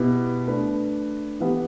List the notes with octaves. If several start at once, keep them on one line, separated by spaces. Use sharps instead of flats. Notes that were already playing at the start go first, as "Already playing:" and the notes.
Already playing: B2 B3 E4 G4 B4
A3 D4 B4
E3 B3 G4 B4